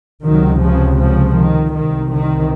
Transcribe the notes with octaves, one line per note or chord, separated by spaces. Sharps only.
C#2 C3 D#3 F#3
C#3 F3
C#3 F3
D#3
C2 C3 D#3
D#3